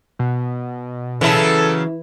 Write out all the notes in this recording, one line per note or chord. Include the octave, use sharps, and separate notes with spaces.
B2
C#3 E3 F#3 E4 A4